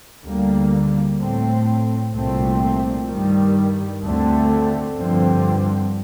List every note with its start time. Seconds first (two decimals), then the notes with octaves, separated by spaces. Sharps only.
0.24 D2 D3 G3 A#3
1.18 A2 A3 C4
2.13 C2 A#2 A3 C4
3.09 G2 D#3 G3
4.03 D2 D3 A3 C4
4.98 G2 D3 F3 C4